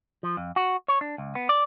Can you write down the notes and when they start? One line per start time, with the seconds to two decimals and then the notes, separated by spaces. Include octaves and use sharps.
0.23 F3
0.37 F2
0.56 F#4
0.88 C#5
1.01 D4
1.18 C#2
1.35 B3
1.49 D5